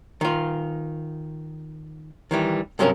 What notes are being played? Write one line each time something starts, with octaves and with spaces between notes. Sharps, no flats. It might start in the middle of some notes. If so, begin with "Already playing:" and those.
D#3 F4
D#3 E3 G3
G2 C3 F#3 C#4 A4 A#4